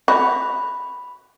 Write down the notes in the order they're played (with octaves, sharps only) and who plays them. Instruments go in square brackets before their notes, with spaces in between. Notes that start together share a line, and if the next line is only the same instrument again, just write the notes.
[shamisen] F#4 [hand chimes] B5